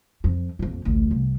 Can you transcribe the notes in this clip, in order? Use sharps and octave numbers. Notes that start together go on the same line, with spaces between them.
F2
A#1 F2
A1 D2
C2